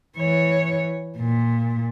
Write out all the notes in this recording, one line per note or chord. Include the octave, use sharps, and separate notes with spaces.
E3 C#5
A#2